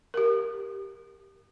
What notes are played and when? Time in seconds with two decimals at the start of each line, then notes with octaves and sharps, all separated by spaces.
0.14 G4 A#4